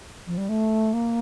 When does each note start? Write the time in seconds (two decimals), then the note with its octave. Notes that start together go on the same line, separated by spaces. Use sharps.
0.27 F3
0.38 G3
0.49 A3
0.93 A#3